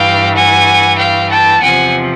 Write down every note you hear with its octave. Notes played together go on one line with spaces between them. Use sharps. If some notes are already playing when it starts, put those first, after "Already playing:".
Already playing: G2 E3 F5 G5
F#5 G#5
F5 G5
G5 A5
E2 C3 F3 F#5 G#5